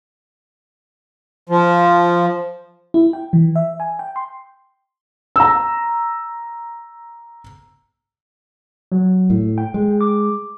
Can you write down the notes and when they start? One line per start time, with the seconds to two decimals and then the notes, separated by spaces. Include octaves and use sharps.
1.49 F3
2.94 E4
3.13 G5
3.33 E3
3.56 E5
3.80 G#5
3.99 G5
4.16 C6
5.36 A#5 E6
8.92 F#3
9.30 A2
9.58 G5
9.74 G#3
10.01 D6